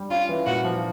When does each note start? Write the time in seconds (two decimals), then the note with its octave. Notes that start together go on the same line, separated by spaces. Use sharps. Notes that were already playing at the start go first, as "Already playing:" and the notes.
Already playing: G3
0.10 C#4 F4
0.29 E3
0.46 A#2 F#4
0.64 F3